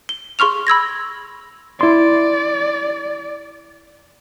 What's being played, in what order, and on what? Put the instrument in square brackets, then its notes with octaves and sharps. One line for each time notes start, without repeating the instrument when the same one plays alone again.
[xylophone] G7
G#4 C6 C#6 F6 F7
B5 E6 G#6 A#6
[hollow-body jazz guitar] E4 C6 [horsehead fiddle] D5